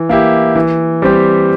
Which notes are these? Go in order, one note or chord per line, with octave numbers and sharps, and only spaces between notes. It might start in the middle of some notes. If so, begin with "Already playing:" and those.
Already playing: E3
A#3 E4 G4
E3
G3 C4 G4